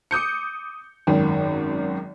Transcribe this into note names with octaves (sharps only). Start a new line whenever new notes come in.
D6 D#6 G6 C#7
G#1 F#2 D#3